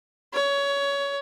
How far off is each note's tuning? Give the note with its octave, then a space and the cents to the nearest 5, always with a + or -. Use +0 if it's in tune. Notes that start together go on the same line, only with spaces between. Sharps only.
C#5 +20